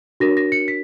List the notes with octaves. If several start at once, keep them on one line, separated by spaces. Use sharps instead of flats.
D4 F#4 A#4 C#5 A#6
A#6
C#7
B6